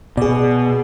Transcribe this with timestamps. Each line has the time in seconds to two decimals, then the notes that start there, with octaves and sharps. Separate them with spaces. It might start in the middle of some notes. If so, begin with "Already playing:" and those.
0.17 B2 G#4 D5